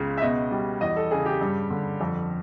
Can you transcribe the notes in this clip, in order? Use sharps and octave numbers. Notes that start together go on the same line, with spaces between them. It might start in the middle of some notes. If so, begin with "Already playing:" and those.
Already playing: C#2 C#3
E5
B2 D#5
G3
E2 D#5
A4
C#3 G#4
G4
G2
D3
F2